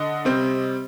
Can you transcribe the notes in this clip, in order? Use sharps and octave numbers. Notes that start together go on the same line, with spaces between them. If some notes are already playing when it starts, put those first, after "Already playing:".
Already playing: D3 D#5
C3 G3 C4